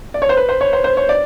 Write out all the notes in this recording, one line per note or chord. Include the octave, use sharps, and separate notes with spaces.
D5
C#5
C5
B4
C5
C#5
C5
C5
C#5
D5